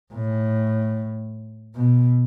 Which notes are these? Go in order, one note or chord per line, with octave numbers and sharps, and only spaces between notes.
A2
B2